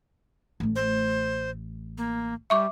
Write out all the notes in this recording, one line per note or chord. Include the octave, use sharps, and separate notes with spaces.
A1 A3
C5
A#3
G3 E5 C#6 D6